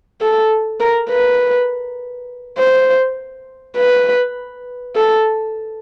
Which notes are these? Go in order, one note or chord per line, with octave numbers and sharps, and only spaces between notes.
A4
A#4
B4
C5
B4
A4